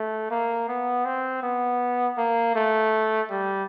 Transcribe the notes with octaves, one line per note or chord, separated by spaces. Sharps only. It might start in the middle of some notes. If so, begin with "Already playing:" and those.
Already playing: A3
A#3
B3
C4
B3
A#3
A3
G3